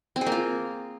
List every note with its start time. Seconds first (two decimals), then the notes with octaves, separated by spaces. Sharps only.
0.16 C4
0.21 G#4
0.26 A#3
0.32 F4